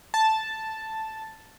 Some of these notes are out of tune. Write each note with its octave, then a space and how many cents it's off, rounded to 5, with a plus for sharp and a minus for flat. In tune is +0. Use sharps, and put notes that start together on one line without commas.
A5 +0